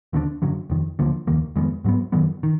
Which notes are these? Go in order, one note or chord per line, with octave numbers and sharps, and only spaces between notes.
D#2 D3 G#3 D4
F#1 F#2 D3 F#3
F1 F2 D#3
D2 D3 F3 A#3
F1 D#2 D#3 A#3
F2 D#3 G#3 B3
G#2 F#3 B3
F#2 D#3 F#3 B3
D#3